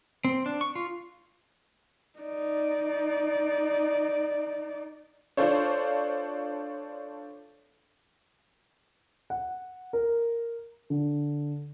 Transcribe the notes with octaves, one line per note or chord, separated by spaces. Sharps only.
C4
D4
C#6
F4
D#4 D5
D4 F4 A4 C5 C#5
F#5
A#4
D3